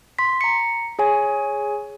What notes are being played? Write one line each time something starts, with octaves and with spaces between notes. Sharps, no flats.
C6 B6
A#5 C#7
G#4 C#5 G#5